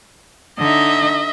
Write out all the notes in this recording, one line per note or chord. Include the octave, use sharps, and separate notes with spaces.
D3 D#4 D#5 E5